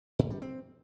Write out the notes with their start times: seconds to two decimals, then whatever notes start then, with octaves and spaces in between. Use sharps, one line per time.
0.19 A2
0.30 G3
0.42 C4